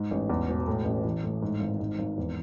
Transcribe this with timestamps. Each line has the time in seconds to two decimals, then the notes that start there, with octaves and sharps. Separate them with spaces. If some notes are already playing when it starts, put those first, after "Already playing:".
Already playing: G#2
0.11 A1
0.29 E2
0.49 E1
0.67 A2
0.85 A1
1.04 E3
1.24 A2
1.42 G#2
1.60 G#1
1.80 G#2
1.99 G#1
2.18 E2